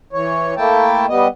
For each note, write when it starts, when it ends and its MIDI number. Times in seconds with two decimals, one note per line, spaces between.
0.13 0.54 52
0.13 0.54 73
0.57 1.06 57
0.57 1.06 58
0.57 1.06 64
0.57 1.06 79
0.57 1.06 81
1.09 1.28 55
1.09 1.28 59
1.09 1.28 75